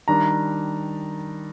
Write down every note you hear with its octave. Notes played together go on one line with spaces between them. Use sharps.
D#3 G3 D4 A#5